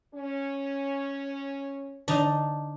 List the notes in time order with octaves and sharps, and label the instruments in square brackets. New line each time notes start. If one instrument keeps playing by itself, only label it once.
[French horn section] C#4
[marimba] D3 [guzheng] D4 D#4